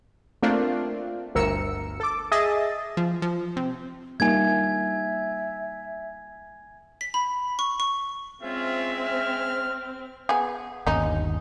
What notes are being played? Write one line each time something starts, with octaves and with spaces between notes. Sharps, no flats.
A3 A#3 C4 D4 F4
G1 D2 A#4 E6 C#7
A4 D6
G#4 D#5 E5 D#6 A6
F3
F3
C3
G3 A#3 D#4 E5 G#5 G#6
B6
B5
C#6
C#6
G#3 C4 C#4 F4 E5
F6
B3 G#4
G1 D#2 C#4 D#4